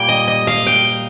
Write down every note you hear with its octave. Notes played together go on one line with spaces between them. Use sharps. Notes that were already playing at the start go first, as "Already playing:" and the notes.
Already playing: A#2 G3 A#3 G5
D#5
D#5
F5
G5